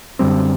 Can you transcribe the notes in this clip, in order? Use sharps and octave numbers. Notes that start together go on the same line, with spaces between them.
F#2 D3 G3 C4